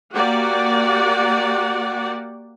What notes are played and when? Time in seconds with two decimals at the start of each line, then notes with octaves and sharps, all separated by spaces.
0.14 A#3 F#4 G4 D5 F#5